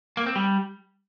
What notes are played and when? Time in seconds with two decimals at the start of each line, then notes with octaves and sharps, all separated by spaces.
0.17 A#3
0.26 C4
0.36 G3